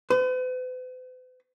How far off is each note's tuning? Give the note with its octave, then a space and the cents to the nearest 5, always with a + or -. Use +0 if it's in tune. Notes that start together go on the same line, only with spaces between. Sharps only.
B4 +45